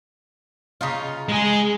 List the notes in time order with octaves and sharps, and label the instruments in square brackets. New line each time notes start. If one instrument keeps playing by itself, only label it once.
[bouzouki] C#3 D#4 F4
[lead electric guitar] G#3 G#4